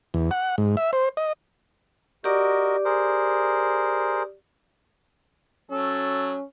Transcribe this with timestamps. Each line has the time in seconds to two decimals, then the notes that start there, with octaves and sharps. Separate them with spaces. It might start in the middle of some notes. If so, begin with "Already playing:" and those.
0.14 E2
0.31 F#5
0.58 G#2
0.77 E5
0.93 C5
1.17 D#5
2.24 F#4 G4 A#4 D5 D#5 D6
2.85 G#4 A#4 C5
5.71 F#3 C#4 A4